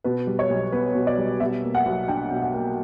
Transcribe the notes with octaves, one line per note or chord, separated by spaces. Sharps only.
B2 B4
G3
C#5
B1
B3 B4
B2
D5
G3
B2 E5
A#3
F#5
B1
D4 G5
B2
F#5
A#3